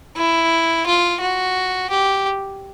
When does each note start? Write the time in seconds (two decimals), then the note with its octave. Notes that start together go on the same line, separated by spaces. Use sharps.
0.16 E4
0.86 F4
1.21 F#4
1.90 G4